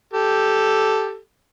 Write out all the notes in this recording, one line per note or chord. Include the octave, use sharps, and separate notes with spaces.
G4 A4